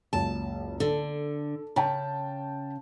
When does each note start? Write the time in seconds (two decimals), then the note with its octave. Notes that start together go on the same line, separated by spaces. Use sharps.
0.13 F#1 C#2 A5
0.80 D3 A4
1.76 C#3 G5 A5